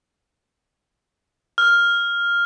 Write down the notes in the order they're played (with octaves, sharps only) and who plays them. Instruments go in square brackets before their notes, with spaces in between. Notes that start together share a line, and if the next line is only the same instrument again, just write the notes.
[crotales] F6